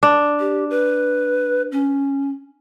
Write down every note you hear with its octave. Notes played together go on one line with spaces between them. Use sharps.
D4
G4
B4
C#4